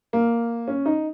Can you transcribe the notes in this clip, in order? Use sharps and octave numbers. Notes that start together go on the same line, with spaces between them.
A#3
C#4
D#4